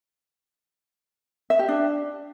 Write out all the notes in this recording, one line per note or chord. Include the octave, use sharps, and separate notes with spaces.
E5
G4
D4